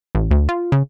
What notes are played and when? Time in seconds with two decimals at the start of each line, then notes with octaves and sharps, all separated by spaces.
0.15 A1
0.31 D2
0.49 F4
0.72 C#3